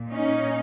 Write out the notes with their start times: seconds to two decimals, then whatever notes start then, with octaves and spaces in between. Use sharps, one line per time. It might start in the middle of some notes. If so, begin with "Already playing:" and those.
Already playing: A#2
0.12 C#4 D#4